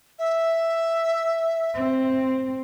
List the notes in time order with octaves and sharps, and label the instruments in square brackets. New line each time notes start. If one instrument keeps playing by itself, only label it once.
[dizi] E5
[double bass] C4